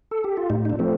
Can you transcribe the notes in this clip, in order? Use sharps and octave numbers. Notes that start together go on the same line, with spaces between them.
A4
G4
F4
A2 D#4
D#4
D4
F3 A3 C4